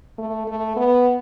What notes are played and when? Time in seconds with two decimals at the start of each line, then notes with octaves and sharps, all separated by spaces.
0.18 A3
0.47 A3
0.76 B3